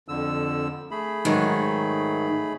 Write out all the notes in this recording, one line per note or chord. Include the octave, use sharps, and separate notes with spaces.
F2 D3 E6
A3 G#4 B5
G#2 D#3 F#3